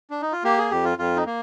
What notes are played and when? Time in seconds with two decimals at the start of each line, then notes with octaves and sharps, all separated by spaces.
0.10 D4
0.22 D#4
0.32 F4
0.44 A#3 G4
0.58 G#4
0.71 F2 G4
0.85 F4
0.98 F2 F4
1.16 D#4
1.26 A#3